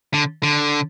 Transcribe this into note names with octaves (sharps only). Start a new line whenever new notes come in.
D3
D3